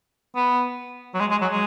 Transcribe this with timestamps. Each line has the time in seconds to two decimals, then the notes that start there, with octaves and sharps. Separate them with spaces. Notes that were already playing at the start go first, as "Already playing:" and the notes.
0.36 B3
1.14 F#3
1.20 G#3
1.31 G#3
1.41 F#3
1.51 G#3